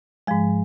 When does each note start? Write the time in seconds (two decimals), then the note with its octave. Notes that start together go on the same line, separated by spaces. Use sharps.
0.27 G#2 F3 G#3